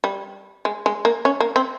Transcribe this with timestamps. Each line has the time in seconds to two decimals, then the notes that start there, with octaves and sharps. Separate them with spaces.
0.04 G3
0.65 G#3
0.86 G#3
1.05 A#3
1.25 C#4
1.40 A#3
1.56 C4